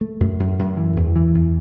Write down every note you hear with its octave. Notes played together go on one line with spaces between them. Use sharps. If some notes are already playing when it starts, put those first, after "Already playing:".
A3
F#2
F#2
F#2
E3
E2
E3
E2